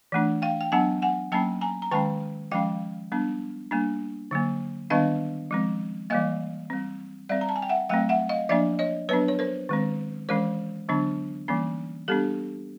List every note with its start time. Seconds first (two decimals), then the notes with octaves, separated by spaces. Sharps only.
0.12 E3 A3 D4
0.42 F5 G5
0.61 G5
0.72 F#3 B3 D4 F#5 G#5
1.02 F#5 G#5
1.32 F#3 A#3 C#4 G5 A5
1.61 G#5 A#5
1.82 A#5
1.92 D#3 G#3 C#4 G5 A5
2.51 F3 G#3 C#4 F5 G5
3.12 G3 B3 D4
3.71 G3 A#3 D4
4.31 D3 F#3 A#3
4.90 D#3 G3 B3 D4 D#5 F5
5.51 F3 G#3 C4
6.10 E3 G3 A#3 D#5 F5
6.70 G3 C4
7.29 G3 C4 D5 E5
7.41 A#5
7.49 A5
7.56 G#5
7.62 G5
7.69 E5 F#5
7.89 F#3 A3 C4 F5 G5
8.09 E5 F#5
8.29 D#5 F5
8.49 F3 A#3 D4 D5 E5
8.79 C#5 D#5
9.09 F#3 B3 D4 B4 C#5
9.28 C#5
9.39 A#4 C5
9.69 D#3 G#3 C4
10.29 E3 G#3 C#4 A#4 C5
10.89 D3 F#3 B3 D4
11.48 E3 G3 A#3 C#4
12.08 G3 B3 D4 G4 A4